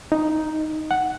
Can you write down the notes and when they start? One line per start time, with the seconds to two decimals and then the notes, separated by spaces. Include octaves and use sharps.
0.12 D#4
0.91 F#5